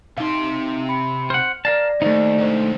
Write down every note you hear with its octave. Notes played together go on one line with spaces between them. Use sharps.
C3 D#4 F5 C6
B5 C#7
C5 F#5 F6
A#4 D5 F5 A5 A#6
D#2 A3 D#4 C5 D5
D#2 G#2 D4 C5